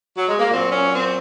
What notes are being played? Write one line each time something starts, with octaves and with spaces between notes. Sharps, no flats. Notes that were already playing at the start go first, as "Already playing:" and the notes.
F#3
G#3
A#3
A#2 F#3 C4
C#4
C4